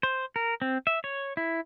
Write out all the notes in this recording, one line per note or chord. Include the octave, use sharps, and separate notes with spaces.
C5
A#4
C4
E5
C#5
E4